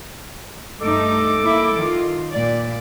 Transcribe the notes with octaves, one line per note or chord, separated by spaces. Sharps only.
G2 A3 D#4 A4 D6
A#3 E4
D#3 F4
A#2 D5